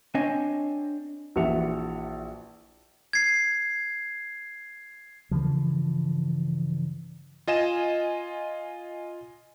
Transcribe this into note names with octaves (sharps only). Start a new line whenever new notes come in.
C4 D4 C#5 D#5 G#5
A#1 E3 F#4 E5 C#7 F7
G#6 C7
G2 C#3 E3 F3
F4 D#5 G#5 E7